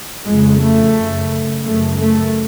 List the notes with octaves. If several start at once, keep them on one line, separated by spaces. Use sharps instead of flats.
F2 C#3 G#3
A3
F#2 C#3
F#2 C#3 A3
A3